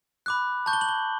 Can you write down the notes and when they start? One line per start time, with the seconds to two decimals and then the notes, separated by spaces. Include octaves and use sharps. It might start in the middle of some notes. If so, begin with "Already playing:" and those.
0.26 B5 D6 F#6
0.66 A5 C#6 G6
0.73 G7
0.81 F#7
0.89 G7